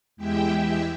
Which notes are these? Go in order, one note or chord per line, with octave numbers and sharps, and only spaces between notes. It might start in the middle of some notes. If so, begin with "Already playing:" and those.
E2 G#3 E4 G4 E5 G5